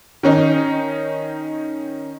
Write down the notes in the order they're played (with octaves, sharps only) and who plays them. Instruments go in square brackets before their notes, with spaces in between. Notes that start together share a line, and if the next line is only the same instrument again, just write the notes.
[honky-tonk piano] D#3 C#4 D#4